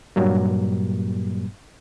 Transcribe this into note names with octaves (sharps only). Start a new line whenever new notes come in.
G2 A#2 F#3 G3 A#3